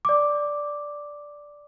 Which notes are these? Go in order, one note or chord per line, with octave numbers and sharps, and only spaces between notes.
D5 D6